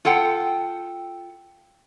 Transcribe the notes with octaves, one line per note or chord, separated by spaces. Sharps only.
F4 A4 F#5 G5